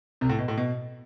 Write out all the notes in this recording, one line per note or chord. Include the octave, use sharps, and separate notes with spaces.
C2 C3
A2
B2
A2
B2